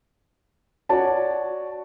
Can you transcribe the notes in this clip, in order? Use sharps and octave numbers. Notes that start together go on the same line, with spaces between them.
F#4 C#5 D5 A5